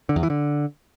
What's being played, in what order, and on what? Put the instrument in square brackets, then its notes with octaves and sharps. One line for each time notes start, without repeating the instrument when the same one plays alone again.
[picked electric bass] D3
E2
E3
D3